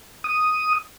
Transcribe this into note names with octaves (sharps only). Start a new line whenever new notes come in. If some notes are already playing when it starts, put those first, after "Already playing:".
D#6